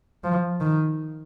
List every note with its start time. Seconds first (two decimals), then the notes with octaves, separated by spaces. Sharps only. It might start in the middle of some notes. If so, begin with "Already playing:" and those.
0.24 F3
0.60 D#3